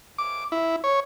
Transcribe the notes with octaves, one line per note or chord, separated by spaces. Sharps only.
D6
E4
C#5